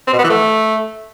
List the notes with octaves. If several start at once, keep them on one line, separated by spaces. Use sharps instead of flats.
C4
B2
B3
E3
A3